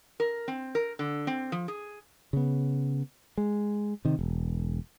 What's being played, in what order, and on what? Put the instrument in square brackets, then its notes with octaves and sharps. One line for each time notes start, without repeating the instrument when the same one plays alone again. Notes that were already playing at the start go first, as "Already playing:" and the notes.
[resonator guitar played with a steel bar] A#4
C4
A#4
D3
C4
F3
G#4
[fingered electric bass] C#3 B3
G#3
C3 D#3
E1